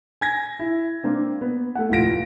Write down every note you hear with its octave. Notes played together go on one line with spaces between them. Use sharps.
G#5 G#6 A#6
E4
A#3 C4 D4
B3
A3 F#5
F1 A2 F4 A#6 D7